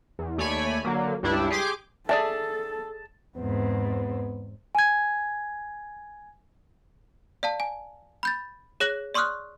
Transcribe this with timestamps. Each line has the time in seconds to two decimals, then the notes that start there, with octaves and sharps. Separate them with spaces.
0.19 E2
0.38 D#2 A3 C#5 D5 G#5 B5
0.85 D3 F#3 A#3
1.23 C#2 G2 G3 D4 E4
1.50 G4 G#4 C6 D6
2.09 G#4 A4 D5 E5 A5
3.37 E2 G#2 B3 C4
4.75 G#5 G#6
7.43 D5 F5 A5
7.60 G#5
8.23 B5 G6 A6
8.80 G#4 C#5 F#6 A#6 F#7
9.14 D5 C6 C#6 D#6 F6 F#6